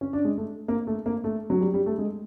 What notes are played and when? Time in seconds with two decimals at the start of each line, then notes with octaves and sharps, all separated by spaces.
0.01 C#4
0.13 D4
0.25 G#3
0.38 A3
0.68 A#3
0.87 A3
1.06 A#3
1.24 A3
1.50 F#3
1.61 G3
1.74 G3
1.86 A3
1.98 G#3